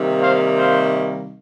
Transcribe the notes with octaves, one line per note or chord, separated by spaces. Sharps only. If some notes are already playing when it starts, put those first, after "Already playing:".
Already playing: C3 D#3 G3 A#3
C5 F5
C5 F5